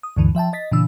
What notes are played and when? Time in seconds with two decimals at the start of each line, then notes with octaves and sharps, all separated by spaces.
0.03 D#6
0.17 D2 G2 D3 E3
0.35 F3 E5 G5 A5
0.53 D#5 A6 B6
0.72 A#2 C#3 E3 D4 E6